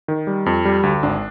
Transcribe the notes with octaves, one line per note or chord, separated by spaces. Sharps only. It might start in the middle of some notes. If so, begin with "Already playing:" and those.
D#3
G3
F2
G3
D2
G#1 D4